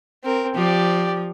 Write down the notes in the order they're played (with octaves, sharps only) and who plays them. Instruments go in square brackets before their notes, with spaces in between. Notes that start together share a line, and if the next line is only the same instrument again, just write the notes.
[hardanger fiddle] C4 A#4
[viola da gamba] F3 [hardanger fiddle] G4 D5